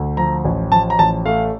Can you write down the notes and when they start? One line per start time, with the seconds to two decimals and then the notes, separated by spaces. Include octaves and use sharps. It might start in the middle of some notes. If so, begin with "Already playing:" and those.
Already playing: D2
0.17 F3 A#5
0.45 A1
0.72 F3 A5
0.90 A#5
0.99 A1 A5
1.26 A3 F5